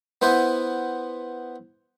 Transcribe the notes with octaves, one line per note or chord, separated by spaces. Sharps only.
B3 E4 C5 E5 F#5 G#5